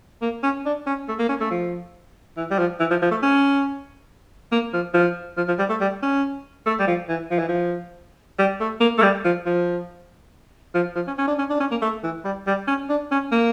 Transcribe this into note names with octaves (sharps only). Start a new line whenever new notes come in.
A#3
C#4
D4
C#4
A3
A#3
C#4
A3
F3
E3
G3
F3
E3
F3
F3
A3
C#4
A#3
F3
F3
F3
F3
G3
A3
G3
C#4
A3
G3
F3
E3
F3
E3
F3
G3
A3
A#3
A3
G3
F3
F3
F3
F3
C#4
C#4
D4
C#4
D4
C#4
A#3
A3
E3
G3
G3
C#4
D4
C#4
A#3